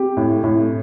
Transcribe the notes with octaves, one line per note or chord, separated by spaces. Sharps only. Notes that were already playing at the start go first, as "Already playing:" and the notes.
Already playing: C4 G4
A2
A2